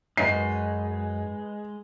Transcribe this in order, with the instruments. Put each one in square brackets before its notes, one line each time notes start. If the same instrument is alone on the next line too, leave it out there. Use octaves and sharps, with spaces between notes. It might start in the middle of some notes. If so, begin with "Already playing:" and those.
[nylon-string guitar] F#2 D#4 F#4 [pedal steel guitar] G#3 [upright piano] B4 D#5 [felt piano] C7